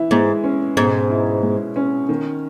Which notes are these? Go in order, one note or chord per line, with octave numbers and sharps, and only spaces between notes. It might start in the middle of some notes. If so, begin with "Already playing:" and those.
Already playing: E3 E4
G#2 G#3
C#4
G#2 B2
E4
G#3
C#4
D#3